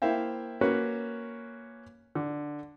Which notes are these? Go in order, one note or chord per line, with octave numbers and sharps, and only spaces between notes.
A#3 E4 C5 E5 F5 G5
A#3 C#4 F#4 B4 C#5
D3